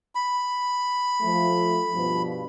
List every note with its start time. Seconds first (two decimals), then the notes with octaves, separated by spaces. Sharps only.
0.15 B5
1.21 F3 A3
1.94 G2 B2 F3